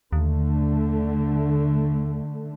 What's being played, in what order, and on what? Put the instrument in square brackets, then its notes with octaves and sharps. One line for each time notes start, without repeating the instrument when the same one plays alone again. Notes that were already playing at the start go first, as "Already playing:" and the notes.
[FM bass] D#2 [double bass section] D3 A3